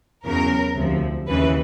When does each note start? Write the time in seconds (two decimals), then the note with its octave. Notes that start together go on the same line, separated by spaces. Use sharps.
0.25 E2 C#3 F#3 A#4
0.76 D2 C3 F3
1.27 D#2 C#3 E3 B4